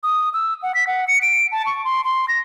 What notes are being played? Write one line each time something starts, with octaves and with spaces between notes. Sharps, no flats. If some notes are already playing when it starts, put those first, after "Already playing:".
D#6
E6
F#5
B6
F#5
C#7
D7
A5
C#6
C6
C6
A#6